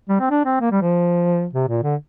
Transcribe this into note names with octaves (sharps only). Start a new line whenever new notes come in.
G3
C4
D4
C4
A#3
G3
F3
C3
A#2
D3